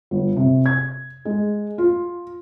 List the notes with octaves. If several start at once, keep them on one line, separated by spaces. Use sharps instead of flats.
G1
C3
G#6
G#3
F4